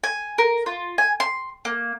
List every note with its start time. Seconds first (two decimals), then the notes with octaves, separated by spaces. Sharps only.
0.04 G#5
0.38 A#4
0.66 F4
0.98 G#5
1.20 C6
1.65 A#3